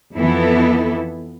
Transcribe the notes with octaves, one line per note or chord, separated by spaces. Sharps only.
F2 E3 B3 E4 A4